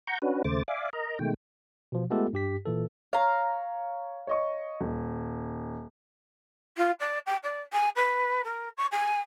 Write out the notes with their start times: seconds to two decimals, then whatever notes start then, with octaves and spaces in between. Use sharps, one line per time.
0.07 F#5 A#5 C#6 G6
0.22 C#4 D4 F#4 B4
0.44 D#2 C#3 A3 C5 D6 A6
0.68 D5 E5 F5 G#5 D6
0.93 A#4 D#5 A#5
1.19 B2 D#3 G#3 A3 G5
1.92 B2 F3
2.10 G#3 A3 B3 F4 G4 A4
2.33 G2 G4 B6
2.66 A#2 E3 A4
3.13 C#5 F5 A#5
4.27 C#5 D#5 C#6
4.81 D#1
6.77 F4
6.99 D5
7.26 G5
7.43 D5
7.72 G#5
7.96 B4
8.44 A#4
8.77 C#6
8.91 G#5